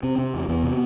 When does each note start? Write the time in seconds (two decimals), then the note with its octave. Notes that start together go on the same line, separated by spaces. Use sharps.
0.03 C3 C4
0.18 C3
0.34 E2
0.48 E2 B3
0.63 C3